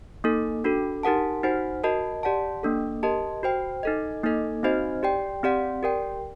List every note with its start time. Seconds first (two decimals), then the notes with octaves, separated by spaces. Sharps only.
0.24 A#3 D#4 A4
0.64 D4 F#4 A4
1.03 D#4 G4 A#4 F#5 A5
1.43 D#4 F#4 C5 F#5
1.84 F#4 A#4 D#5 A5
2.23 G4 D5 F#5 A5
2.63 A#3 D4 A4
3.03 G4 A#4 D#5 A5
3.43 F#4 C5 G5
3.83 D#4 A4 D#5
4.23 A#3 D#4 A4 D#5
4.63 C4 D#4 F#4 C5 D#5
5.03 G4 D5 G5
5.43 C4 G4 D5 F#5
5.83 G4 A#4 D5 G5